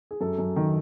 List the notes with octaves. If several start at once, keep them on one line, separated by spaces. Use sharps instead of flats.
G#4
F#2 A4
F#2
D#3